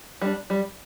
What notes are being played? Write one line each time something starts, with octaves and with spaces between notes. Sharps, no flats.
G3 D4
G3